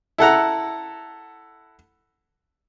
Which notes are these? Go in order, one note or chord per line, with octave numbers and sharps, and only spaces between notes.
E4 A4 F#5 A#5